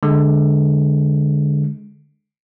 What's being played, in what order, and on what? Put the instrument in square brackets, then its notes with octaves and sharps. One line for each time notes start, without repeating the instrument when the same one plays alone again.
[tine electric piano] D3 G#3